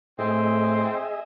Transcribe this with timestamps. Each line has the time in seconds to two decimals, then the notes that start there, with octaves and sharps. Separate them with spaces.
0.19 A2 C4 G#4 D#5 E5